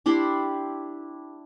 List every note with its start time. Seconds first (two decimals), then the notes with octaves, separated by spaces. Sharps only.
0.06 D4 E4 G4 C6